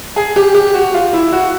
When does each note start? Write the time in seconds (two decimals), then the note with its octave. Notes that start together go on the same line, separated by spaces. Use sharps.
0.16 G#4
0.36 G4
0.55 G4
0.74 F#4
0.94 F4
1.13 E4
1.33 F#4